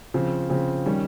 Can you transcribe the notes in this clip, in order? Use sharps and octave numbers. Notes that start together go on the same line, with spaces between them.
C#3 F3 C4
C#3 F3 C4
D#3 G3 C#4